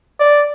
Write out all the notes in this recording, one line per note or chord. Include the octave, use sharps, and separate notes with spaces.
D5